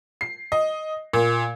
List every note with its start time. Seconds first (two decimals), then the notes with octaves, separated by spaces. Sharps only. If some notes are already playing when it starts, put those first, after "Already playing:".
0.21 C7
0.52 D#5
1.13 A#2